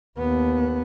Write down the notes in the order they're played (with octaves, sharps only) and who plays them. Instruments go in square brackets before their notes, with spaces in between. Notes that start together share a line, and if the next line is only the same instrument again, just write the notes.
[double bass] D#2 B3